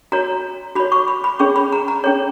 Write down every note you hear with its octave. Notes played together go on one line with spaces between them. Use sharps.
F#4 C#5 A#5
F#4 C#5 B5
C#6
B5
B5
C#4 G#4 C#5 C#6
B5
A#5
A#5
C#4 G#4 C#5